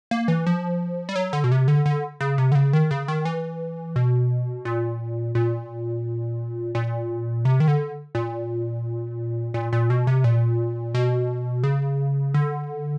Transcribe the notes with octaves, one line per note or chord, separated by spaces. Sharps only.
A#3
E3
F3
G3
F#3
D3
B2
C3
D3
D3
C#3
C3
D3
C#3
D#3
C#3
D#3
E3
B2
A#2
A#2
A#2
C3
D#3
D3
A#2
A#2
A#2
B2
C3
A#2
B2
C#3
D3